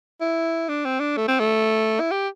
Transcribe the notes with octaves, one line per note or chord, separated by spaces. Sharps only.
E4
D4
C4
D4
A3
C4
A3
E4
G4